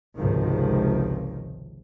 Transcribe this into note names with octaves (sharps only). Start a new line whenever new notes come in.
G#1 C#2 C3 D#3 F3